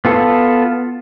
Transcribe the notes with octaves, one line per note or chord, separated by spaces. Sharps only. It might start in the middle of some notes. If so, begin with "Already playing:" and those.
B3 F4 A4